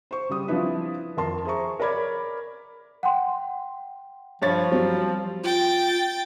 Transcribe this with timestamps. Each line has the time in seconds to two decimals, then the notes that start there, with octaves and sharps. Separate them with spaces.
0.11 C5 C#6
0.29 C#3 G3 D#6
0.48 F3 C4 D4 E4 B4
1.17 F2 A#4 A5 C6
1.45 G#4 C5 E5 A#5 C#6
1.80 A#4 C#5 D5 B5 D6 G#6
3.03 F#5 G5 C6
4.42 G2 F3 C#5 A6
4.72 F#3 G3 C4
5.44 F4 G5 A6